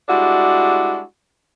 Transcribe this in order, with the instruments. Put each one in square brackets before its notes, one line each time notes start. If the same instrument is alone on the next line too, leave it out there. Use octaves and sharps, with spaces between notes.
[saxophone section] G3 G#3 D4 E4 F#4